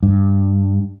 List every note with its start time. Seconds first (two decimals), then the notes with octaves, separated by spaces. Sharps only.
0.03 G2